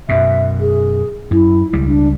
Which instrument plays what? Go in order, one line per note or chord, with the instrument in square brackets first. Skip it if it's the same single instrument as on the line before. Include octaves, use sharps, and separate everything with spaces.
[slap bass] F#2 B2 [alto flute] E5
[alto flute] G#4
[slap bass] F#2 [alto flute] E4
[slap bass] C#2 G3
[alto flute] D4